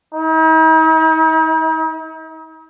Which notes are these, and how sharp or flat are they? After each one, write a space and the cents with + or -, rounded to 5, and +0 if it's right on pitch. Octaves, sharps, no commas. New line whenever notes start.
D#4 +45